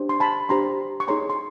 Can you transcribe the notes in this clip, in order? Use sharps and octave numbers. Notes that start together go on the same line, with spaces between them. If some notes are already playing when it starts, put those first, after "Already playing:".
Already playing: D4 G4 C5
C6
A5 B5
D4 G4 C5 A#5 C6
C#6
D#4 G#4 C#5 A#5 C6
C6